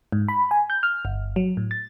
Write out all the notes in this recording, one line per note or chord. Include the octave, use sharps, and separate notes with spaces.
G#2
B5
G#5
G6
F6
G1
F#3
A2
A6